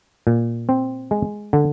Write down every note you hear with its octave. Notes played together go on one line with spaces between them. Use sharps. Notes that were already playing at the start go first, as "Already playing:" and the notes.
A#2
C4
G#3
D3